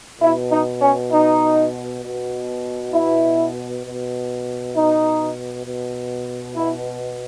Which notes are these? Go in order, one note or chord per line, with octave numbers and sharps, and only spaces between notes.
B2 E4
D#4
C#4
D#4
B2
E4
B2
D#4
B2
E4